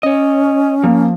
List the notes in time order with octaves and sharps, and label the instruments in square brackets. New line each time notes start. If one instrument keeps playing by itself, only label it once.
[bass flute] C#4 [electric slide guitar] C#5 D#5
[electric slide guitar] F3 [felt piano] A#3